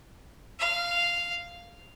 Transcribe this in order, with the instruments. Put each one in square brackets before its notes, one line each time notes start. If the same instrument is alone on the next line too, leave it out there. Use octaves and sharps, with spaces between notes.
[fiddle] F5